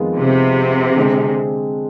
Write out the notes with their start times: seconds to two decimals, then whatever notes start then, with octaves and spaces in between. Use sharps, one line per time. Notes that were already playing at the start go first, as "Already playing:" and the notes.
Already playing: F2 D#3 G#3 B3 F4
0.16 C3
0.96 D3 G#3 C4